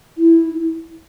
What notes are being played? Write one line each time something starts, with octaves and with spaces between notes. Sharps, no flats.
E4